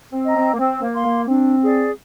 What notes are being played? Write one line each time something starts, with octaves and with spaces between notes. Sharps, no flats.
C4
D#5 A#5
C4
A#3
C4 C5
A#3
F5 C6
A#3
C4 D4
G#4 D5